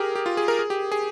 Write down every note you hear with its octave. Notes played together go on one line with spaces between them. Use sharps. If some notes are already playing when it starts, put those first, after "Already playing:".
Already playing: G4 G#4 A#4
G4
F4
G#4
A#4
G#4
G4
G#4